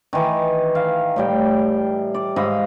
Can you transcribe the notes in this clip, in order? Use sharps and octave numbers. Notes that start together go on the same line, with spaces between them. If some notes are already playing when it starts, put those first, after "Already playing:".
D#3 E3
F5
A2 G3 G5
D5
G#2 D#5 F5 B5